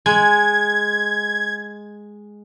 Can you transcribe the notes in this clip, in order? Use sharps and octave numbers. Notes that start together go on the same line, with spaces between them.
G#3 G#6